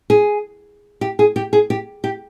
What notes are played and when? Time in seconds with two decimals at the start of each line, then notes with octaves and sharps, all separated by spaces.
0.10 G#4
1.01 G4
1.19 G#4
1.36 G4
1.53 G#4
1.70 G4
2.04 G4